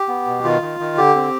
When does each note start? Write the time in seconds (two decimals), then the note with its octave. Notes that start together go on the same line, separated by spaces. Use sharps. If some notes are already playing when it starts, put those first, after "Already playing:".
Already playing: G4
0.08 B3
0.27 B2
0.44 D#3 F4
0.62 D#3
0.80 D#3
0.98 D3 G4
1.16 C4